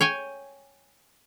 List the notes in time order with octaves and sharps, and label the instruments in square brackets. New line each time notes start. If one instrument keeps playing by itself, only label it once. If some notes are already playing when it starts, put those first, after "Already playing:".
[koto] C#5 G5 G#5